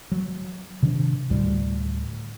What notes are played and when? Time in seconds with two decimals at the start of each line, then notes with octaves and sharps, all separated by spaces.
0.12 F#3
0.83 C3 D#3 F3 D4
1.30 D2 A2 G3